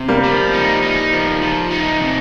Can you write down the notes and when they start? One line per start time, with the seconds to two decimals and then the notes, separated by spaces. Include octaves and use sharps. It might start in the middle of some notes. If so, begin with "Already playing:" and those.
Already playing: C3
0.08 G3 A#3
0.24 F3
0.53 D#4
0.83 D#4
1.13 F3
1.42 F3
1.71 D#4
2.01 C3